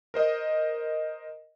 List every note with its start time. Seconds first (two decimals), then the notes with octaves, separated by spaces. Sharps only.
0.14 A#4 C5 D#5